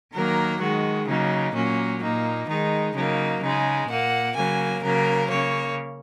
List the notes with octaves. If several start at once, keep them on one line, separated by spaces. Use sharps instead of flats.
D#3 F#3 A#3 A#4
D#3 G#3 F#4
C#3 F#3 A#3 D#4
A#2 F#3 A#3 C#4
A#2 A#3 D#4
D#3 G#3 D#4
C#3 F#3 A#3 D#4
C#3 G#3 D#4
A#2 A#3 F#5
C#3 F#3 A#3 G#5
C#3 F#3 A#3 A#4
C#3 A#3 C#5